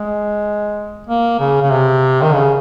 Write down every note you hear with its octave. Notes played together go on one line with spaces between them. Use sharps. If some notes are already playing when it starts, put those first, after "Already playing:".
Already playing: G#3
A#3
C#3
C#3
C3
D#3
C#3